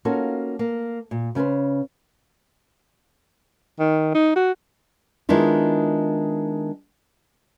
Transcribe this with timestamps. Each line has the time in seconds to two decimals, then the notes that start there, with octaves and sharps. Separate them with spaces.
0.05 A#3 C#4 D#4 F4 F#4 A4
0.59 A#3
1.11 A#2
1.35 C#3 C#4 A4 B4 C5
3.79 D#3
4.15 D#4
4.36 F#4
5.29 D#3 G#3 B3 D4 E4 F4